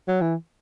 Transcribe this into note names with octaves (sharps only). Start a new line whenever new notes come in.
F#3
E3